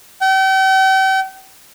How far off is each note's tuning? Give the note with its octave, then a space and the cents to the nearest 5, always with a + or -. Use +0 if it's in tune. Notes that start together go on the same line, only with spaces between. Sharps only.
G5 -40